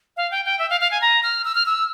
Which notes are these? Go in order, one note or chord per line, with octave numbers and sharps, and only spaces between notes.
F5
G5
G5
E5
F5
F5
G#5
A#5
F6
E6
F6
E6